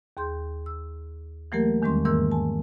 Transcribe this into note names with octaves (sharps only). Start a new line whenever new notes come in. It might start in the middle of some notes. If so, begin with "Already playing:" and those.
D#2 G#4 C6 G6
E6
E3 F#3 A3 A#3 G4 A#4
E2 D#3 G3 G#3 C#4 C6
G#2 D#3 E3 A#3 A#4 E6
G#5 A5